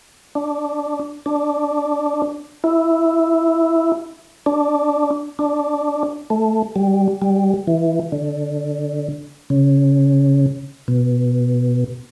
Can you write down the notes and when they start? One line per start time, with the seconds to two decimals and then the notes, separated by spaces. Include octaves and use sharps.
0.35 D4
1.26 D4
2.64 E4
4.46 D4
5.39 D4
6.30 A3
6.76 G3
7.22 G3
7.67 E3
8.12 D3
9.50 C#3
10.88 B2